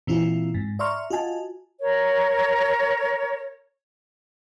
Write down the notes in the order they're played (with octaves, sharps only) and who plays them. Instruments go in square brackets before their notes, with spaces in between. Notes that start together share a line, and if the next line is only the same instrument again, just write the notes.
[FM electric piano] A#2 E3 C4 E4 F4
G#2
D5 E5 A#5 C6 C#6 F6
F4 F#4 D#5 G#5 A5
[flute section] A#4 C#5